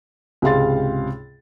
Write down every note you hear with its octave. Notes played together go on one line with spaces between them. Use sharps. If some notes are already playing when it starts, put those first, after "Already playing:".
C#2 G#2 C3 F5 C6 A6